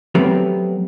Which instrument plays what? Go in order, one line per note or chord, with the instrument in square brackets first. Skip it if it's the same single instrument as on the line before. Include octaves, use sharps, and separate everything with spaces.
[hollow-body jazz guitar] F#3 A3 B3 C4 G4 A#4